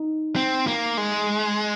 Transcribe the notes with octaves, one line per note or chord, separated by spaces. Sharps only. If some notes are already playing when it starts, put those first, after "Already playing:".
Already playing: D#4
C4
A#3
G#3